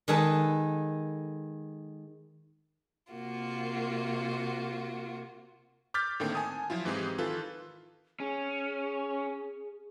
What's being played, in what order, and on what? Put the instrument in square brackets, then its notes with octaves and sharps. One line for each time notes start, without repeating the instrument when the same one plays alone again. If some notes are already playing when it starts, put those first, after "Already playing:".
[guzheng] D#3 G#3 G#4 A4 B4 A5
[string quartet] C3 A#3 F4 F#4
[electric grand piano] D6 F6 G6 A6 B6
A2 D3 D#3 A#3 C4 G5
G#5 A5 D#6
F3 F#3 E4 F4
G#2 E3 G#3 C4 G4 G#4
D#3 E3 F4 A4 B4
[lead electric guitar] C#4 [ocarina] G#4